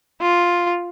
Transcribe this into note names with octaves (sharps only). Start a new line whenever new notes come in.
F4